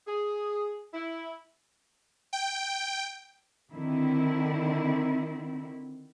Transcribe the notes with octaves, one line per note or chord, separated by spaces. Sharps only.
G#4
E4
G5
D3 D#3 C4 E4